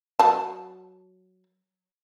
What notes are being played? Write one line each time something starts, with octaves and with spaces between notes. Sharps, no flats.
F#3 A5